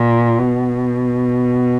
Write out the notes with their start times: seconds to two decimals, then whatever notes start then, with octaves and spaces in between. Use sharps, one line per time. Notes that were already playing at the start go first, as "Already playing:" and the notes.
Already playing: A#2
0.38 B2